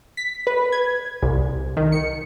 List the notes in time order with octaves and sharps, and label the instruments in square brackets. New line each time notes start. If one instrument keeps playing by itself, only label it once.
[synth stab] B6
B4
G#6
C2
D#3
C#7